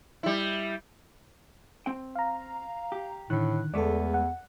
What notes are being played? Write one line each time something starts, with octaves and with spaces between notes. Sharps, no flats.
G3 E4
C4 G5
F5 A#5
G4
A2 D3 D#3 F#6
E2 G#3 A3 B3 A4 D5
F#5